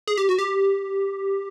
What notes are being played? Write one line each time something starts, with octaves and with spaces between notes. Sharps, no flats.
G#4
G4
F#4
G4